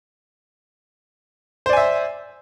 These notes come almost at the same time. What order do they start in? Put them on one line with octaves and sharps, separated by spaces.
C5 D5 G#5 E5